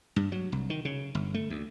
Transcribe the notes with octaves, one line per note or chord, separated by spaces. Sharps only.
G2
F#3
C2
D#3
C#3
G1
A3
D2